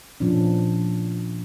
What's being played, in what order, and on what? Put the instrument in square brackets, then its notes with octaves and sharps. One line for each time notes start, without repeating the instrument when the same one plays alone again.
[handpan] A#2 F3 C#4 D4